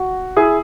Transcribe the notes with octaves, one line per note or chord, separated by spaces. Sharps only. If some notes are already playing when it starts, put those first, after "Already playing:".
Already playing: F#4
E4 G#4